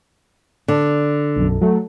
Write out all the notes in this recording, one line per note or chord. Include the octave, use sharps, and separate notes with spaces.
D3
B1 F#2
F#3 A3